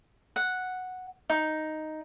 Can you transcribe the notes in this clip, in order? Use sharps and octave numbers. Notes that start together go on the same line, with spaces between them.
F#5
D#4